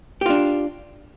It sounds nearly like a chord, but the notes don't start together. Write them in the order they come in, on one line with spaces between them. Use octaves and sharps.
G4 F4 D4